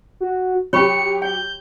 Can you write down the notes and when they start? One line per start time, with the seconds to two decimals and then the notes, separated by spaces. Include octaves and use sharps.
0.20 F#4
0.73 F#3 G4 C#5 B5 C#6 C#7
1.22 G5 G6